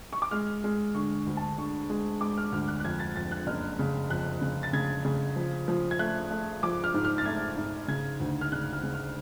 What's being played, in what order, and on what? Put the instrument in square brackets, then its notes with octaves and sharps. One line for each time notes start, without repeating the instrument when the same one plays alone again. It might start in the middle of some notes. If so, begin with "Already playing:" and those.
[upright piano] C#6
D6
G#3 F6
G#3
D3 C#6
D2
A5
D3 C#6
G#3
G#3 D6
F6
D2 F6
F#6
F#6
F2 G#6
A6
F2 A6
F#6
F#1 F6
C#3
F2 F#6
C#3
A6
C#3 G#6
C#3
F3
F3
G#6
A3 F#6
A3
F3 D6
F6
G#2
F6
A6
A3 G#6
G#2
C#3 G#6
D2
F6
C#3 F#6
F6
C#3
F6